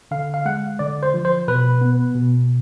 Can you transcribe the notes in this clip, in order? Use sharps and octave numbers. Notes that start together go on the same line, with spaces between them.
D3 F5
F5
G#3 F#5
D3 D5
C5
F3
C5
B2 B4
B3
B2